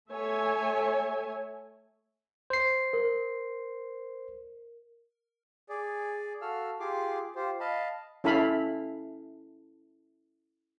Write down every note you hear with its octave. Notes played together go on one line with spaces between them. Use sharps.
A3 A4 C#5 E5 G#5
C5 C7
A#4
G#4 D5
F#4 A4 F5 E6 F6
F4 G4 G#4 C6 D6
F4 G4 C5
D#5 F5 A5 B5
C#4 E4 A4 F5 B5